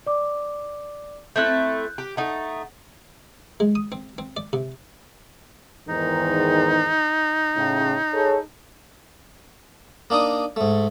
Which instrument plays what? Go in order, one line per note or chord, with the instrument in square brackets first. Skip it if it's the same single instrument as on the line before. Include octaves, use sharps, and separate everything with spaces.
[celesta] D5 D6
[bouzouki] A3 C4 E4 [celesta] F#6 G6
[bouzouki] G4
[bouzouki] A3 D#4 [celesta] F#5
[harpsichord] G#3
D#6
C4
C4
D5
C3
[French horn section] E2 G#2 D#3 [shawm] D#4
[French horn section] A2 C#3
G#4 A4 C#5
[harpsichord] A#3 D4 D#4 D#6
G#2 A3